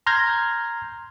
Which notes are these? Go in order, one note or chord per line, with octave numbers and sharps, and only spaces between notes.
A#5 C6 F6 G6 G#6 A#6